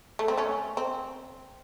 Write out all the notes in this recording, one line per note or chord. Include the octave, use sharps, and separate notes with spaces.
A3
C4
A3 C#4
C4